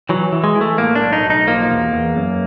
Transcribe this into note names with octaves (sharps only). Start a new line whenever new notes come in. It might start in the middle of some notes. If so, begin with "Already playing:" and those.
E3 F#3
E3
G#3
E3
A3
A2 A#3
D4
B1
D#4
B1
D#4
F3 A#3
E2
E2
F#2